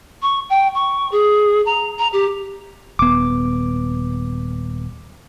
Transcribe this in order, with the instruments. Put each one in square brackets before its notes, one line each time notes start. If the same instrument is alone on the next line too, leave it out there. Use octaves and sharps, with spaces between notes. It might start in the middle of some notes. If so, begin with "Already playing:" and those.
[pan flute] C#6
G5
C#6
G#4
A#5
A#5
G4
[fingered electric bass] D#1 B3 [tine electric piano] D6